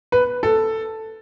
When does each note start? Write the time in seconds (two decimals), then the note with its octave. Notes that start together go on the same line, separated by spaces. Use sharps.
0.12 B4
0.43 A4